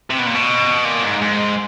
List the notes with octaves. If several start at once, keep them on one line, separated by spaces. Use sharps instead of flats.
C3
B2
A#2
B2
A#2
G#2
G#2